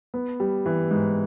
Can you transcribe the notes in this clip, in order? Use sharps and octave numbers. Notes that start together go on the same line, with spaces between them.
B3
G3
E3
G#2